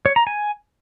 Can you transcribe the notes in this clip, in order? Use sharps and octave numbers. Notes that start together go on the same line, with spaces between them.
C#5
A#5
G#5